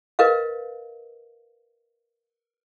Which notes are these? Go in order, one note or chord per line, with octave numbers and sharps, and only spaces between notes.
A#4 B4 D#5 F5